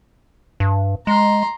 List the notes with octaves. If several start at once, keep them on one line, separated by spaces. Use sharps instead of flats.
G2
G#3 A#5 C6